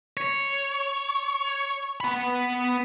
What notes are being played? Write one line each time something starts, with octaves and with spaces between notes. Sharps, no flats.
C#5
B3 B5